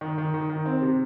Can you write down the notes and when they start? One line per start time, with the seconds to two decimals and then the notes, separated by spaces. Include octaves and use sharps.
0.01 D#3
0.18 D#3
0.34 D#3
0.49 D#3
0.66 C4
0.82 C3